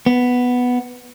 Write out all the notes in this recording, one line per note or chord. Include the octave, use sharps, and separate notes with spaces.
B3